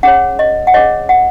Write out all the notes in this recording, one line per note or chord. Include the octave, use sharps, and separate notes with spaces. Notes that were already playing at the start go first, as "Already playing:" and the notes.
C#4 G#4 C#5 F#5
D#5
F#5
C#4 G#4 C#5 D#5
F#5